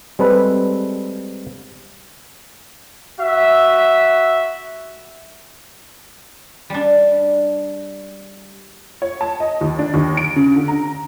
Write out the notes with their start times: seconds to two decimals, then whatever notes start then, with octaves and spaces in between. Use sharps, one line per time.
0.19 G3 G#3 C4 A4 B4
3.20 F#4 E5
6.70 G3 D4
9.02 C#5
9.21 A5
9.40 D#5
9.61 D#2
9.79 D4
9.94 D#2
10.17 D7
10.36 C#3
10.56 D3
10.68 A#5